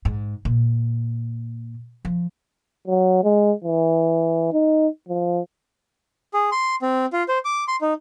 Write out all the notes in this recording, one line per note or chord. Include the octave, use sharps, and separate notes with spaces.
G#2
A#2
F3
F#3
G#3
E3
D#4
F3
G#4
C6
C4
F4
C5
D6
C6
D#4